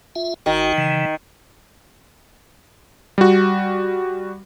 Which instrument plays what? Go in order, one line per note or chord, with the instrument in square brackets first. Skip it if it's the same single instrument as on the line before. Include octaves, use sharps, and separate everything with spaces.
[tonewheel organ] F4 E5
[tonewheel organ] G#1 F#4 [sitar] D#3
[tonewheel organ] C#3 E3
[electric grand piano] G3 F#4